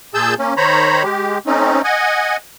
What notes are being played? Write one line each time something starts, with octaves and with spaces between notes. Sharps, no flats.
A#2 G#4 A5 E6 G6
A#3 C#4
D#3 C5 C#5 A#5 B5
G#3 G4
A3 C4 C#4 D#4
D#5 F#5 G#5